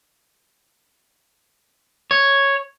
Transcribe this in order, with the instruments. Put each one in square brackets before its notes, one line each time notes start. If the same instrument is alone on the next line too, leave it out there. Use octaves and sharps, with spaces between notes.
[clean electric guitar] C#5